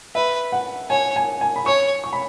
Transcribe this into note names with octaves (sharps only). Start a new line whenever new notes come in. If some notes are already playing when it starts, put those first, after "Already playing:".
B4 E5
F#5
C#5 G#5
G#5
G#5
B5
C#5 C#6
C#6
B5